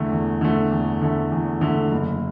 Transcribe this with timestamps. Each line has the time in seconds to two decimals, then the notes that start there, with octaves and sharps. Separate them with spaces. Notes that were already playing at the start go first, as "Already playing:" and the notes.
Already playing: E2 D3 A3
0.12 E2
0.41 D3 A3
0.71 E2
1.01 D3 A3
1.32 E2
1.61 D3 A3
1.92 F#1